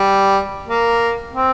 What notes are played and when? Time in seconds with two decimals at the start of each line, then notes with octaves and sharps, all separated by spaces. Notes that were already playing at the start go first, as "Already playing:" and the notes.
Already playing: G3
0.68 A#3
1.33 C4